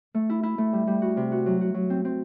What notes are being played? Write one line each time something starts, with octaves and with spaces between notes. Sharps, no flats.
A3
E4
E4
A3
G3
G3
F#4
C3
F#4
F#3
F#4
F#3
C4
C4